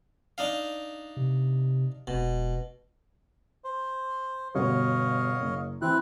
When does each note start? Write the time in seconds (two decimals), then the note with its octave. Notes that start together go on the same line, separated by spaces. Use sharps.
0.38 D4 D#4 F5
1.17 C3
2.07 E1 B2
3.64 C5
4.55 G1 B2 B3 C#5 D#5 F5
5.40 F#1
5.82 E3 C4 E4 F#6